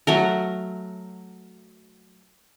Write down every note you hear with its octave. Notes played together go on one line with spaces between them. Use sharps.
F#3 A3 A#4